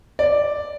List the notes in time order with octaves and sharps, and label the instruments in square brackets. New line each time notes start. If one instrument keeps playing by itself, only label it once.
[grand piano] D5